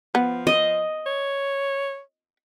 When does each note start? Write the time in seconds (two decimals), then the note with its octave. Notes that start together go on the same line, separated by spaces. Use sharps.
0.15 F3 B3
0.47 D#5
1.06 C#5